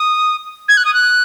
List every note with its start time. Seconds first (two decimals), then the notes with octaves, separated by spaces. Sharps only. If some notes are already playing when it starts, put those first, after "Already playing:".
Already playing: D#6
0.69 G#6
0.77 F#6
0.85 D#6
0.94 F#6